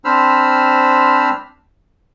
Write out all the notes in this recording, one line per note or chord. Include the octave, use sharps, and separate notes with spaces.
C4 D4 C5 B5 E6 F6